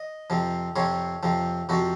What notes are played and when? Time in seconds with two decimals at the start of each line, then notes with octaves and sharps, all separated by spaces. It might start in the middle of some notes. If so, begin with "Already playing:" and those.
Already playing: D#5
0.30 F2 C3 F3
0.76 F2 C3 F3 C#5
1.23 F2 C3 F3
1.69 F2 C3 F3 F#4